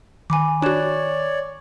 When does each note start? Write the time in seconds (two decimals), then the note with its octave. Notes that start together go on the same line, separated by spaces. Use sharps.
0.30 D#3 G#5 B5 D6
0.62 D4 F#4 C#5 D5 F#6 E7